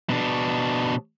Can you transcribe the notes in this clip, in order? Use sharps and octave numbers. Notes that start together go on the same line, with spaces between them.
B2 D4